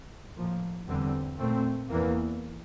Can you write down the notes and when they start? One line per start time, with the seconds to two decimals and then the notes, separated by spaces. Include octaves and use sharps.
0.36 A2 F3 A#3
0.87 E2 D3 G3 C4
1.39 A#2 A3 C4
1.90 E2 E3 A#3